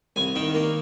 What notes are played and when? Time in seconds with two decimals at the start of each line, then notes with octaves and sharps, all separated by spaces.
0.16 C2 G#5
0.35 D#3 G5
0.55 A#3